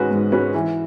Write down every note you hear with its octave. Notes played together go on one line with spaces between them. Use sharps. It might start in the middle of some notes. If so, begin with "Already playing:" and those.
Already playing: G#2 G#3 C#4 F#4 B4
G#2
G#3 C#4 F#4 B4
E3